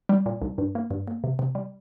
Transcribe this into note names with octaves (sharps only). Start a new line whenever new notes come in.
G3
A#2
C2
G2
A#3
G2
A#3
C3
C3
G3